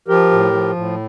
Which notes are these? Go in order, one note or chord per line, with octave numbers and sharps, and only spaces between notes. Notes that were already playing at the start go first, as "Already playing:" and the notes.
F3 G4 A#4
A2
F3
A2